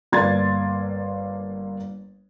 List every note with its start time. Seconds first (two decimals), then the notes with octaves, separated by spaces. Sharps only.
0.12 G1 A#3 D5 C6 G#6 A6